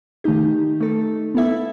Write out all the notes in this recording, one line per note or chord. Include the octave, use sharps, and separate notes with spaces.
D#3 A3 D#4 G4
A3 D#4 A4
B3 E4 A4 E5